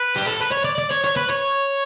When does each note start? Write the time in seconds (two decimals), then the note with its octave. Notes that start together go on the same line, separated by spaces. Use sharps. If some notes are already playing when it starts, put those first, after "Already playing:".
Already playing: B4
0.16 G4
0.28 A4
0.40 B4
0.52 C#5
0.65 D5
0.78 D5
0.91 C#5
1.04 C#5
1.16 B4
1.30 C#5